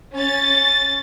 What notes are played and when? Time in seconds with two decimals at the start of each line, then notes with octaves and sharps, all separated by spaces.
0.13 C#4 A6